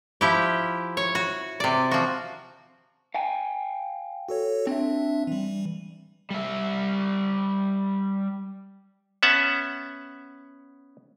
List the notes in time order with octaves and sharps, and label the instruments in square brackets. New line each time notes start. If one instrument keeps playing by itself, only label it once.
[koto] F3 E4 G4
C#5
F#4
C3 D5
F3 F#4
[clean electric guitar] F5 G5 G#5
[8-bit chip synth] F#4 A4 C#5
[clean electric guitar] C4 [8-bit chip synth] D4 E5
[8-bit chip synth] E3 G3
[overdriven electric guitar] G3 E5
[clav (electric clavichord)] B3 C#4 E5 F#5 A5